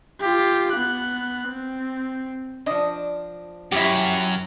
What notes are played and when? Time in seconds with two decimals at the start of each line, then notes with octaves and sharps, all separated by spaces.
0.20 F4 G4
0.72 B3 F#6
1.49 C4
2.66 F3 D4 D#5
3.72 F#2 E4 G4